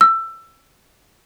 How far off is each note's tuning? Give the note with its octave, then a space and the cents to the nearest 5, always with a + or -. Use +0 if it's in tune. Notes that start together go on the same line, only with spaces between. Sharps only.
E6 +20